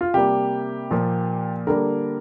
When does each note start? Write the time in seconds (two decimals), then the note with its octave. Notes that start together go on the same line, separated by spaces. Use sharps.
0.01 F4
0.14 C3 G3 A#3 G4
0.91 A#2 F3 A#3
1.67 D3 G3 A#3 A#4